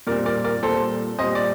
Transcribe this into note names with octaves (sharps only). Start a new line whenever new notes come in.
A#2 G3 C4 A#4 D5
A#4 D5
A#4 D5
A#2 G3 C4 A4 C5
A#2 G3 C4 C5 D#5
D5